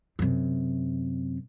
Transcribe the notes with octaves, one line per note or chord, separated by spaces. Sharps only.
F#2 C3